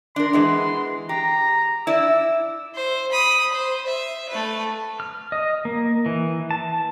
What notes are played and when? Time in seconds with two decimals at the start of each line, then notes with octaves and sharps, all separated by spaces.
0.16 D4 A#4 C6
0.33 E3 G#3 B3
1.09 G4 A#5
1.87 E4 D5 E6
2.75 C5
3.12 B5 D#6
3.52 C5
3.87 E5
4.29 A3 B4
5.00 F6
5.32 D#5
5.65 A#3
6.06 E3
6.51 A5